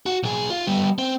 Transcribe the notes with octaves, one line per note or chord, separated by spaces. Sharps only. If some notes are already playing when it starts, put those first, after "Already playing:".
F#4
B1 G#4
F4
G3 B3
C4